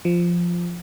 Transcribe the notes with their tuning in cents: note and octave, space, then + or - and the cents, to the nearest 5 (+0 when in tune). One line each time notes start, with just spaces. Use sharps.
F3 -5